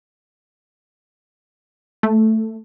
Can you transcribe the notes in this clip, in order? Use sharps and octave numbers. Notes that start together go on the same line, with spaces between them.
A3